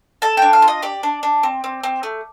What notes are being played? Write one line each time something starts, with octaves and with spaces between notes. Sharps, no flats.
A4 A5
D4 G5
F5
F4
D#5
G4 D5
D4
D4
C4
C4
C4
A3